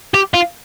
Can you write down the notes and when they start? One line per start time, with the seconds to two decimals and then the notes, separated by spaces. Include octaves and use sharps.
0.14 G4
0.34 F4